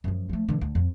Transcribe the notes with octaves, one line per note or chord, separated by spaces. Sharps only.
F#2 F3
F3 A3
D3 E3
D2
F2